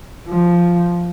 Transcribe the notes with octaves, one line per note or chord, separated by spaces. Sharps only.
F3